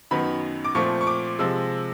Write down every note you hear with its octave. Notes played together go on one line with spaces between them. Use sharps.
F#2 D#3 F#3 B3 B5
D6
A#2 F3 A3 C4 C#6
C#6
D6
C3 F3 G#3 E6